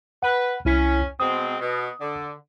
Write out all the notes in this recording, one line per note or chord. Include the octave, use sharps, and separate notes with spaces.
B4 F#5
C2 C#4 E4 B6
B2 G#3 C4 D#6
B2
D3